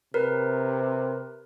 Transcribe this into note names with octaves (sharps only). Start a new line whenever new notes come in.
C3 A#4 B4